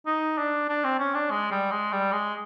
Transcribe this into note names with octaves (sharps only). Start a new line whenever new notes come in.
D#4
D4
D4
C4
C#4
D4
G#3
G3
G#3
G3
G#3